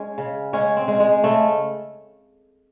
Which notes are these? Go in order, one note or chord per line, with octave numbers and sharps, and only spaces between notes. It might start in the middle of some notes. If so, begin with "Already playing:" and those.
Already playing: G#3 C#4
C#3
G#3 C#4
C4
G#3
G#3
C#3 A3